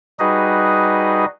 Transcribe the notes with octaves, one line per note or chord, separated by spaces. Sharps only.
G3 D#4 F#4 G#4 B4 D#5